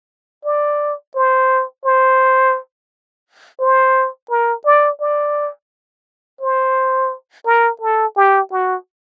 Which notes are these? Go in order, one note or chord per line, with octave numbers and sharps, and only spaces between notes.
D5
C5
C5
C5
A#4
D5
D5
C5
A#4
A4
G4
F#4